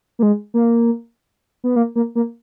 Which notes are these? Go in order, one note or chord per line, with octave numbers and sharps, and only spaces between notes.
A#3
G#3
A#3
B3
A#3
A#3
A#3